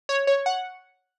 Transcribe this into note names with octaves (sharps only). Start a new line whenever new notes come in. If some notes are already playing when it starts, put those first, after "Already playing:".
C#5
C#5
F#5